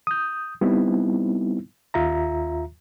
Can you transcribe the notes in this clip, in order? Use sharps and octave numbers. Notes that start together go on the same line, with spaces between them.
D#6 G6
G3 B3 C4 D#4 E4
D#2 F4 E5 A#5